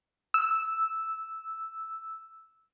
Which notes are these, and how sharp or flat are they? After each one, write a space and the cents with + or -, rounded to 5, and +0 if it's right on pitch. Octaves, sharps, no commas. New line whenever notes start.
E6 -5